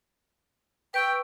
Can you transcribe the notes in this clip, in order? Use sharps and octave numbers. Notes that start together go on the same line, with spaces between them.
B4 G5 C#6 E6